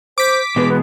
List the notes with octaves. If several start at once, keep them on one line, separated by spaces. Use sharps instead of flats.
C5 D6 B6
B2 E3 G#3 B4
B3